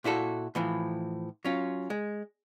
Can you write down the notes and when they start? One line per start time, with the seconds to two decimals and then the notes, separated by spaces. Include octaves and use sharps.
0.04 A#2 E4 F#4 A4
0.55 A2 E3 F3
1.45 F#3 C#4 F4
1.90 G#3